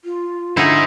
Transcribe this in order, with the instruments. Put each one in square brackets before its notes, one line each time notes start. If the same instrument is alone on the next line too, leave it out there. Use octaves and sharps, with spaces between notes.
[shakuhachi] F4
[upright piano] D3 [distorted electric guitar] D#4 C5 [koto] E4 G#4